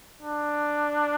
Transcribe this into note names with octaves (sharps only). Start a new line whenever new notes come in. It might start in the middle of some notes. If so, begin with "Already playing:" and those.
D4